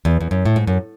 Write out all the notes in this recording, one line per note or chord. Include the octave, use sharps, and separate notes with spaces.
E2
E2
F#2
A2
G#2
F#2